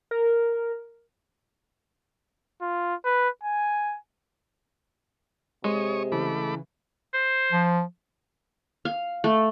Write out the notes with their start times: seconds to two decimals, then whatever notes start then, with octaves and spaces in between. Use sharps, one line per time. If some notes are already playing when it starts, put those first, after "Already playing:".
0.11 A#4
2.61 F4
3.04 B4
3.43 G#5
5.64 C3 G#3 C#5 C#6 D#6
6.12 C#3 E3 A3 B5 D6
7.14 C5
7.52 F3
8.85 F5
9.24 A3